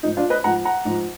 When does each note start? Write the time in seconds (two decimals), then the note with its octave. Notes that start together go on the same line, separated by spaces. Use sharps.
0.03 G#2 F3 D#4
0.17 D4 F4
0.30 B4 D#5
0.44 G#2 F3 F#5 A#5
0.65 F#5 A#5
0.85 G#2 F3